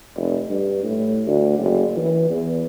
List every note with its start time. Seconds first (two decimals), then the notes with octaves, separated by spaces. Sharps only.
0.16 F1
0.50 G2
0.84 A2
1.27 D2
1.59 F#1
1.97 E3
2.30 E2